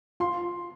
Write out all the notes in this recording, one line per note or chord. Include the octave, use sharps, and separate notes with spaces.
F4 C6